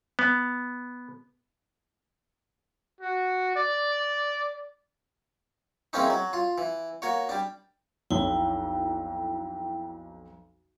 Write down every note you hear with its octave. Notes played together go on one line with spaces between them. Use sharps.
B3
F#4
D5
E3 G#3 A#3 C4 C#4 D#4
F#3
F4
E3
A#3 F#4 C#5
G3 D4
B1 F2 E4 G5